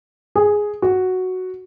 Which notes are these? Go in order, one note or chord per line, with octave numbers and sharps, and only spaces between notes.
G#4
F#4